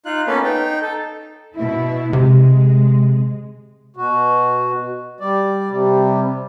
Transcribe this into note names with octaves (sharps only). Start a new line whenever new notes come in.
D#4 F4 F#6
A#3 B3 C#4 A4 B4
D#4 G5
A4
B2 E4
C3 G#3
B2 F#4
G3 D5
C3 G3